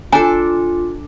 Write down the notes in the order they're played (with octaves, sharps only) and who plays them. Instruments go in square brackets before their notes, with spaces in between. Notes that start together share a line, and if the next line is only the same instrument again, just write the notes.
[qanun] D4 A4 [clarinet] F4 [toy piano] G#5 A#5